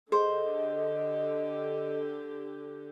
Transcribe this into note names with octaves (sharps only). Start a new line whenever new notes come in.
D3 G4 G#4 C5 D#5